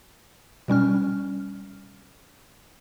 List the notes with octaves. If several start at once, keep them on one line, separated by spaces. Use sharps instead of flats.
B2 G3 C#4 F6